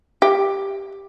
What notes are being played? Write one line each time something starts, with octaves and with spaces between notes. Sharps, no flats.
G4